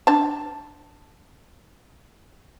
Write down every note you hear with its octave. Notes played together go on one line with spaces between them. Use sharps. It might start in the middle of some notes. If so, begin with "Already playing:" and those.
D4 A5